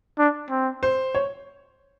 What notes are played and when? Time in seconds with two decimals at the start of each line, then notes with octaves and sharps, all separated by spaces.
0.19 D4
0.50 C4
0.83 C5
1.15 C#5